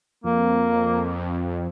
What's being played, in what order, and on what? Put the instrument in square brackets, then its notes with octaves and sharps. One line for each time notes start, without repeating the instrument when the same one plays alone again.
[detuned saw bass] F2 [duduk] A#3